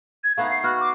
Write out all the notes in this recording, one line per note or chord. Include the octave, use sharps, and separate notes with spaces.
G#6
A3 B3 D#4 F5
C7
B3 F#4 F6
D6